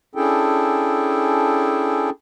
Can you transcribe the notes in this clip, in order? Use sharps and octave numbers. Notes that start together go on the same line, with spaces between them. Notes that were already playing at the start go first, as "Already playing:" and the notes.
C#4 D4 E4 G#4 A4 G5